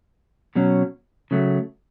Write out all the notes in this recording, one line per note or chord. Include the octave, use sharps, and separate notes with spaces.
B2 F#3 C#4
C#3 F#3 A3